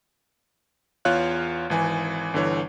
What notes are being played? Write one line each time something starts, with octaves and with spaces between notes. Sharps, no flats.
E2 F4 C#5 F5 F#6
G#1 E3 G#5
G1 D3 E3 C#5